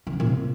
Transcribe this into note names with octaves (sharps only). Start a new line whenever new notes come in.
D#3
D3
A#2
C3